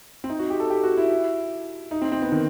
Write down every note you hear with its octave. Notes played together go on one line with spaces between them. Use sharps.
C4
D#4
F#4
G4
A4
G4
F#4
E4
D#4
C4
C4
B3
D#3